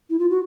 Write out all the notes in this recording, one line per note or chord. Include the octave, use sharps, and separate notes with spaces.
E4
F4
F#4